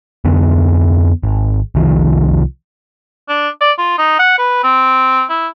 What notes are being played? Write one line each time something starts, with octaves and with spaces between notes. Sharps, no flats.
F2 D3 B3
G#1
C2 D#3 F3
D4
D5
F4
D#4
F#5
B4
C4
E4